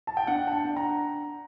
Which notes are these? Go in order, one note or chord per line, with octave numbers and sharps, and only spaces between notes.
A5
G5
D4 F#5
A5
G5
D4
A#5